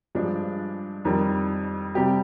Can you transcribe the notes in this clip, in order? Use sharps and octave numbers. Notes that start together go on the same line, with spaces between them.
G2 F3 G#3 D4
F2 D#3 G3
C3 G3 C4 G4